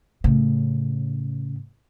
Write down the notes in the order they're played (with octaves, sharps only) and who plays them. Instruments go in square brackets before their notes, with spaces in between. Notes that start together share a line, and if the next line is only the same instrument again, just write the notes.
[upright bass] A2 C#3